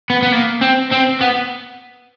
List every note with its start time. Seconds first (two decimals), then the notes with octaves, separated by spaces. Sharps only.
0.10 B3
0.22 B3
0.32 A#3
0.61 C4
0.91 C4
1.21 B3